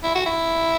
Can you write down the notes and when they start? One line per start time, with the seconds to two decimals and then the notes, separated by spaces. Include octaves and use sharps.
0.03 E4
0.15 F#4
0.26 E4